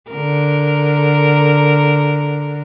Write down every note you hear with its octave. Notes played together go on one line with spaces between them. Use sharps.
D3 A#4